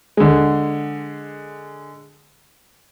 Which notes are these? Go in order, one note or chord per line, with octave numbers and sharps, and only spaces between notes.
D3 G#3